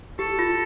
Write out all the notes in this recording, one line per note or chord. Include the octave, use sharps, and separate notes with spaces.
G4 A4
F4